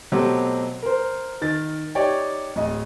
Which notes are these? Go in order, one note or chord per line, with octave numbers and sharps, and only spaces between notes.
B2 F#3 A3 C4 G4
A#4 C5
D#3 A6
D#4 G4 C#5 D5 G5
D1 D#5